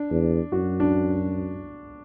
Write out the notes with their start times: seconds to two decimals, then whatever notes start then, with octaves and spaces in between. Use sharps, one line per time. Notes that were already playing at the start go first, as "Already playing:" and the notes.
Already playing: D4
0.11 E2
0.52 F#2 F#4
0.80 D4